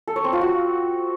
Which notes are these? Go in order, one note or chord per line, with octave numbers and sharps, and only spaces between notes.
A4
C#5
C4
F4
F#4